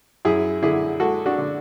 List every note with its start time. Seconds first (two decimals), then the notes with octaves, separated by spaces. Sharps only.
0.25 F#2 E4 G#4
0.63 D3 E4 G#4
1.00 G#3 F#4 A4
1.26 D4 F#4
1.38 D3